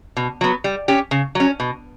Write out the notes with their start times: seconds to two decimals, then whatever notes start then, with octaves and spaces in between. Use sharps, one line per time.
0.17 B2
0.41 F#3 B3
0.64 G3
0.88 C#4 G4
1.11 C#3
1.35 F#3 C#4
1.60 B2